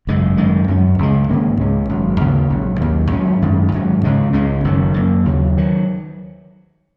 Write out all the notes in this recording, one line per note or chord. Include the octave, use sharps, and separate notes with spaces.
G#1 F#2 C#3 G#3
F#2 D#3 G#3
F#2 F#3 A#3 C#4
C#2 C#3 G#3
G#2 D#3 A#3 C#4
C#2 C#3 G#3 C#4
G#1 F#2 F#3
D#2 C#3 A#3 C#4
A#1 G#2 F#3
D#2 D#3 F#3 A#3
G#2 F#3 C#4
F#2 D#3 G#3
G#2 D#3 F#3 C#4
C#2 C#3 G#3 C#4
C#2 C#3 G#3 C#4
F#1 F#2 D#3 F#3
F#2 F#3 A#3
D#2 C#3 F#3
D#3 F#3